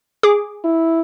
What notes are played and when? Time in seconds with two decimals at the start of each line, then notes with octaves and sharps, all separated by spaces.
0.23 G#4 D6
0.64 E4